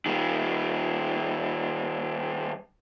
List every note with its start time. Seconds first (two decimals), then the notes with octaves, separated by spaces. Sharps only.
0.06 D#3 G3